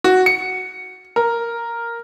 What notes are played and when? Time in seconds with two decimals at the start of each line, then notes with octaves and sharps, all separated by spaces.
0.04 F#4
0.26 C#7
1.16 A#4